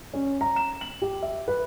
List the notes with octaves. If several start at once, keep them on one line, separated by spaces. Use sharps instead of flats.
C#4
A#5
E7
F#7
G4
E5
B4